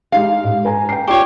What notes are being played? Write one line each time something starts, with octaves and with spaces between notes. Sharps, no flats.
G#3 D#4 G4 F5
G#2
B4 G#5 A#5
G5 A#5 C7
F4 G4 C#5 D5 C#6